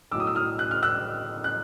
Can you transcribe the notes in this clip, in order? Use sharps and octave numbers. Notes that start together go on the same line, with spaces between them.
B1 A2 F#3 D6 E6
D#6
E6
D#6 F6
F#6
F6
E6 F#6
F#6